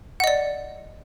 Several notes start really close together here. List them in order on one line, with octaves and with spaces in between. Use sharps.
F#5 D#5 D5